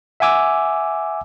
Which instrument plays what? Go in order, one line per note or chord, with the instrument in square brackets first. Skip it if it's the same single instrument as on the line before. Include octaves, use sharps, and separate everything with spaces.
[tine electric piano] E5 F#5 G#5 D6 E6